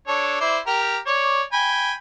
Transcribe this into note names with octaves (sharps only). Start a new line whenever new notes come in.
D4 A4 C#5
E4 C5 D5
G4 A#4
C#5 D5
G5 G#5 B5